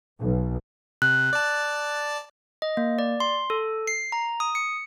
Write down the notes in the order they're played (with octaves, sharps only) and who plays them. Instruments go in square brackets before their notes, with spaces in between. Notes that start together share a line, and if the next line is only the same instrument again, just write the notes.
[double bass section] B1
[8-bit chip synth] C3 [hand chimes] F#6
[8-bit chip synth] D5 A5
[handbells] D#5
A#3
D5
C6
A4
C7
A#5
D#6
C#7